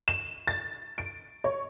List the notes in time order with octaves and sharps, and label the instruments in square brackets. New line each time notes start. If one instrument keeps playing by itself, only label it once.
[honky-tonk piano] E7
A6
D7
C#5